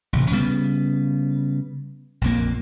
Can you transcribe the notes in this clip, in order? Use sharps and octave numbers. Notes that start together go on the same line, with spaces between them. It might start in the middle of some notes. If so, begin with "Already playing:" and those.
A1 C3
C#3 G3 B3
A#1 F2 A#3